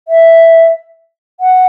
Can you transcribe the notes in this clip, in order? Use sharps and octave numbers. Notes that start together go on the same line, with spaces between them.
E5
F#5